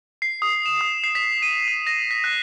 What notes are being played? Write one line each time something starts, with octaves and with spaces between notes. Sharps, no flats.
C7
D#6
E7
D#6
C7
B6
D#7
D#7
A#6
B6
F#6